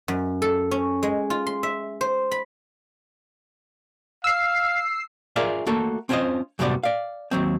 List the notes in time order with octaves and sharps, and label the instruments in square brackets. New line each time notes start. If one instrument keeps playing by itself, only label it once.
[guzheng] F#2
A4
C#4
G#3
F4
C6
E5
C5
B5
[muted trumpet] F5 [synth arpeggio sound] E6 C7
[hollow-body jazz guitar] F4 G#4 A#4 D5 E5 F5
A3 A#3 F#4 A4
C4 C#4 F4 A#4 C5 D#5
F#2 A2 C3 G3 B3 D5
D5 F5
D#2 F#3 C4